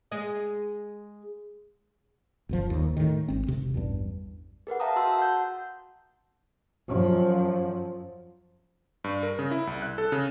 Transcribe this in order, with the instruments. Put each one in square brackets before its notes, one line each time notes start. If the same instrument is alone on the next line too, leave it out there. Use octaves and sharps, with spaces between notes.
[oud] G#3 G#4 D#5
[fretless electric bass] G1 C#2 F3
D#2
A2 D#3
G#1 C4
E1 C3
A1 E2 G2
[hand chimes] G#4 A#4 B4 F#5
E5 F5 G5 A5 A#5 D#6
F#4 A5 C6 E6
F#5 G6
[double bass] F#2 F3
[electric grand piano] G2
A#4
C#3
E4
C2
F#6
A4
C#3